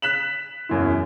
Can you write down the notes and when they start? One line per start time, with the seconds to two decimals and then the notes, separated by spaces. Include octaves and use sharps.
0.02 F#6 B6 E7 F#7
0.69 E1 F#2 E4